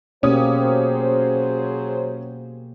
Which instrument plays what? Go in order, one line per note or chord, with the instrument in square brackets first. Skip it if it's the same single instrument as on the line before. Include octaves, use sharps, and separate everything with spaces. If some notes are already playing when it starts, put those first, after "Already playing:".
[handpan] B2 A#3 G4 [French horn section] F#3 G#4 C5 [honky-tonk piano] C#4 D#6